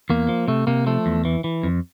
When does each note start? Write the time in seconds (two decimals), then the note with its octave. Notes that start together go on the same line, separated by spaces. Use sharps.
0.10 E2 A#3
0.29 F3
0.48 C3 A3
0.67 C3 A#3
0.86 F3 A3
1.06 E2
1.25 E3
1.44 E3
1.63 F2